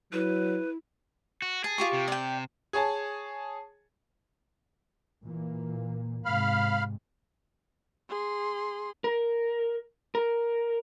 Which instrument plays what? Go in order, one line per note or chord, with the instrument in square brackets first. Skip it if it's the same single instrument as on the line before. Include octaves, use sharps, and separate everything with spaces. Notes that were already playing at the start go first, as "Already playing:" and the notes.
[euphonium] F#3 [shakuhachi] E4 [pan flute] B4
[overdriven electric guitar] F#4
[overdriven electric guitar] G#4 [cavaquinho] A5
[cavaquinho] F4 G4 C#6
[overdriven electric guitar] C3
[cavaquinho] D5 G5
[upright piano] G#4 C#5 G#5 A5
[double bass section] A#2 E3 A#3
[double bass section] G#2 C3 [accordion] F5 B5 F6
[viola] G#4 C6
[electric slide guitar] A#4
A#4